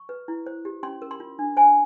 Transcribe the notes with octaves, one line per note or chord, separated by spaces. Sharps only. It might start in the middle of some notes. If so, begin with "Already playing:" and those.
Already playing: C#6
B4
E4
C5
G4
C#4 C6
A#4
C6
F4
D4
C5 G#5